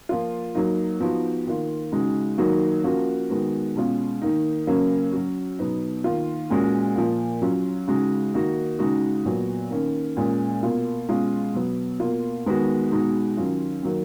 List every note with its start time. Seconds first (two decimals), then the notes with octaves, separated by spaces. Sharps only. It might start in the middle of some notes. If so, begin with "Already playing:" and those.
0.09 F3 A#3 F4
0.55 F#3 A#3 D#4
1.00 F3 B3 D#4 F#4
1.47 D#3 A#3 F4
1.92 C#3 G#3 D#4 F#4
2.38 D#3 F#3 A#3 D#4 F#4
2.84 F3 A#3 C#4 F#4
3.30 D#3 G#3 B3 F#4
3.76 B2 G#3 C#4 F4
4.22 D#3 A#3 D#4
4.67 C#3 F#3 A#3 C#4
5.12 F#3 C#4 F#4
5.59 B2 F#3 B3 D#4
6.04 D#3 A#3 F4
6.50 A#2 G#3 C#4 F#4
6.96 A#2 F3 A#3
7.42 F#3 C#4 F4
7.88 C#3 G#3 D#4 F#4
8.34 D#3 A#3 D#4 F#4
8.79 C#3 G#3 D#4 F#4
9.25 A#2 F#3 B3 F#4
9.71 D#3 A#3 C#4
10.17 A#2 G#3 C#4
10.63 B2 A#3 F4
11.08 B2 G#3 C#4 F4
11.54 B2 F#3 B3
12.00 B2 A#3 F4
12.46 D#3 G#3 B3 F#4
12.92 B2 G#3 D#4 F#4
13.37 D#3 F#3 C#4 F4
13.83 D#3 F#3 A#3